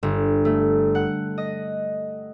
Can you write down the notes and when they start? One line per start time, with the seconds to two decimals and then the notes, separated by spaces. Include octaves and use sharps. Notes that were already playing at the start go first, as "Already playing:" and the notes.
0.03 G1
0.45 A3
0.95 F#5
1.38 D#5